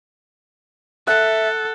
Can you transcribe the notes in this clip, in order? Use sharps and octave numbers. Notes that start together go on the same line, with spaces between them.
A4 E5 F#5